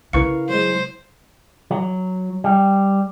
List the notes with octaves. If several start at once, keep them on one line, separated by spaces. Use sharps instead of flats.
C#3 E4 A#4 B4 F5 C#6 C#7
F#3 G#3 C5
F#3
G3